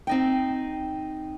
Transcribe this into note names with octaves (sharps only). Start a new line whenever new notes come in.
C4 D#4 G5